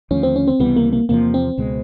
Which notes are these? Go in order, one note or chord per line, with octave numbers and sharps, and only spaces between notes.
D#2 D3 F3 A3 C#4
C4
C#4
C4
C#2 C3 E3 G3 B3
A#3
A#3
E2 C3 F3 A#3
C4
C#2 B2 G#3